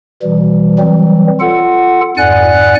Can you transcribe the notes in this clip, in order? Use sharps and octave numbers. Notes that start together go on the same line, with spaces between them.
B2 E3 G3
E3 F#3 G3 C4
F4 A4 F#5
F2 G#2 D5 F#5 G#5 F#6